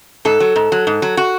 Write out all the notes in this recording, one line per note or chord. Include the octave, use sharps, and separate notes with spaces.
G#2 A4
F#3
G#2
F#3
G#2
F#3
F#4